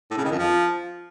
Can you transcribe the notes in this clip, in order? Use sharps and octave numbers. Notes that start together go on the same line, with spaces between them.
A2
C#3
D#3
F2
F3